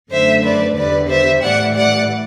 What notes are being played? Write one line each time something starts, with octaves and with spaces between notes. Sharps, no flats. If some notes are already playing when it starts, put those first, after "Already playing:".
F#2 D3 A3 C5 E5
B4 D5
E2 D3 G3 B4 D5
C5 E5
A2 E3 G3 D5 F#5
D5 F#5